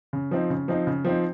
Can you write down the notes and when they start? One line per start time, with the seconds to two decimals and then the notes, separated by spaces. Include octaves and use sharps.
0.13 C#3
0.31 F3 C4 D#4
0.50 C#3
0.68 F3 C4 D#4
0.87 C#3
1.05 F3 C4 D#4